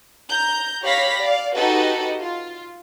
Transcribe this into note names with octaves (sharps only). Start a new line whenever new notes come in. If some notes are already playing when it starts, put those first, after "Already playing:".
A#5 G6
G4 C#5 F5 B5 A#6 B6
D5 F5
D#4 F#4 G4 A4 B4 D#5
F4